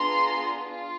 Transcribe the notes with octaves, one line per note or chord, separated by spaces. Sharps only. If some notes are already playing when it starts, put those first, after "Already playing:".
Already playing: B3 D4 F4 G#4 A#5 C6
F4